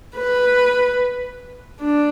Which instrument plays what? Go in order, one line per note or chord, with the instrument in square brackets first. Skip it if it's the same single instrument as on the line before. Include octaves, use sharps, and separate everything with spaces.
[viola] B4
D4